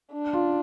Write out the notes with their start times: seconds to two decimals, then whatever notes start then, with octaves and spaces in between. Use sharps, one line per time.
0.12 D4
0.33 F4